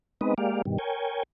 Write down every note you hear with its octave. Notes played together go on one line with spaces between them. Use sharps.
G#3 B3 C4 D#4 B4 D#5
G#3 A#3 G4 D5 F5
G2 B2 D#3 G3
A#4 C#5 G5 G#5